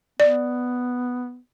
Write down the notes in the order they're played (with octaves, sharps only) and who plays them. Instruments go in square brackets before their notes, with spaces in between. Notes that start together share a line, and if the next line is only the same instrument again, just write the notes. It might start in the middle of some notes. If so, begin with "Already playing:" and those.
[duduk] B3 [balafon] D5